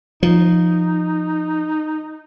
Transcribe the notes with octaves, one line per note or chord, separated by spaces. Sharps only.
F3 D#4